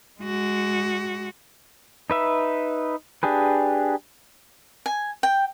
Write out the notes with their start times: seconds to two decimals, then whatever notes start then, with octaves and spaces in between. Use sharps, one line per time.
0.20 G#3 F#4
2.10 D#4 B4 E5
3.23 D4 G4 G#4 B4
4.86 G#5
5.23 G5